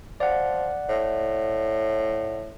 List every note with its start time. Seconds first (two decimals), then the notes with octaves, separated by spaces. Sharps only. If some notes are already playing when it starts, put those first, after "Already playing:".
0.20 F3 D5 F#5
0.89 A2